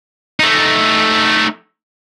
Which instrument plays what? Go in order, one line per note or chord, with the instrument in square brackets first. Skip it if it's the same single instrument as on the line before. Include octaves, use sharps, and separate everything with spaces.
[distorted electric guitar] A3 D#4